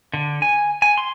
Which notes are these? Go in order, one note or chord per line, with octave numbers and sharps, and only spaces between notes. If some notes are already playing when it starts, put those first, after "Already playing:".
D3
G#5
G#5
C6